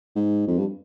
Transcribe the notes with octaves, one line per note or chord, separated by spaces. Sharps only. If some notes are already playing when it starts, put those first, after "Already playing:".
G#2
F2
G2